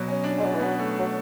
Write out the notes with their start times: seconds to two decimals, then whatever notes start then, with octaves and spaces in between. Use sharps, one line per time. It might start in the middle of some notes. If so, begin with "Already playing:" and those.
Already playing: B2 F#3
0.08 C#4
0.24 D4
0.38 G#3 C#4
0.46 F#3
0.54 E3
0.60 F#3 B3
0.79 A3
0.99 F#3